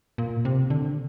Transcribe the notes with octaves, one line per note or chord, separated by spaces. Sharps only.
A#2
C3
D3